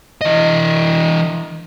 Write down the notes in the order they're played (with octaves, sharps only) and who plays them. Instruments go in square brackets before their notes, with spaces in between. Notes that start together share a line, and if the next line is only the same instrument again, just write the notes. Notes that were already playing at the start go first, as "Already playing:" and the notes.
[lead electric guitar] E3 D#5